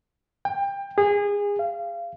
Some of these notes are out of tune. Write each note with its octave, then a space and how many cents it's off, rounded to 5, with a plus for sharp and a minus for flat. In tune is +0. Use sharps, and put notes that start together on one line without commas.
G5 +25
G#4 -25
F5 -25